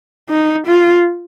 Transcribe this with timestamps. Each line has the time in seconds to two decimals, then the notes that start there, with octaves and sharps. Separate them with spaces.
0.30 D#4
0.67 F4